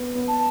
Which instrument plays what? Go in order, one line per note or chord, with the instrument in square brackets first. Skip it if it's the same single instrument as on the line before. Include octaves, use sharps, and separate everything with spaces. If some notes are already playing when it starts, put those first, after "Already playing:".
Already playing: [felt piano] B3
B3
[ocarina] A5